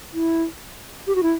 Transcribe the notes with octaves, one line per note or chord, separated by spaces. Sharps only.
E4
G4
F#4
E4